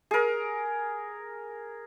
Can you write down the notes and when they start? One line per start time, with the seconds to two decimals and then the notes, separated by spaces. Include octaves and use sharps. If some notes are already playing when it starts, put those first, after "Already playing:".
0.11 G#4 A#4